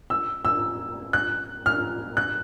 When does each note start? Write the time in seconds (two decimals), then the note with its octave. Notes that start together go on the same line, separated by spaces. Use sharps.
0.10 E6
0.45 E6
1.13 F#6
1.66 F6
2.17 F#6